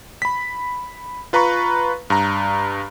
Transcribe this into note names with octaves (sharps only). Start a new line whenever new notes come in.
B5 B6
F4 B4 A#5 B5 C#6
G2 A#5